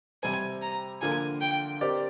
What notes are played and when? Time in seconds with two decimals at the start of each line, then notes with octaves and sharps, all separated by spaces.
0.23 C3 G3 C4 G#5
0.62 A#5
1.02 D3 F3 A#3 F4 G#5
1.41 G5
1.81 C4 G4 A#4 D5